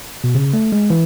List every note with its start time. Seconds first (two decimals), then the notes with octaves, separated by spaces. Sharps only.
0.24 B2
0.35 C#3
0.53 A3
0.72 G#3
0.90 E3